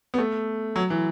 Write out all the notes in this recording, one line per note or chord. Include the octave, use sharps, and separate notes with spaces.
B3
A3
F#3
E3